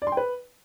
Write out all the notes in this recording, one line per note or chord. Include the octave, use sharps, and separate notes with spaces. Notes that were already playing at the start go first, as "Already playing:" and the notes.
D5
C6
G5
B4